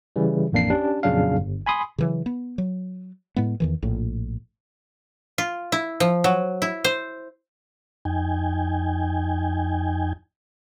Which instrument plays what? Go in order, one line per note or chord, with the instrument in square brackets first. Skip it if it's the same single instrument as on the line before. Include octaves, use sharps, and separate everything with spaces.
[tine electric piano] C#3 E3 G3
A1 F2 A#3 D4 C7
C#4 D4 G4
F2 A#2 C#3 F#3 D4 F5
G1
G#5 B5 C6 D#6
[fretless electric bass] C#3 E3 F#3
B3
F#3
A2 G#3 B3
E2 D#3 E3
A#1 A2
[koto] F4
E4
F3
F#3
E4
C5
[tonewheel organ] F2 D#4 G5 G#5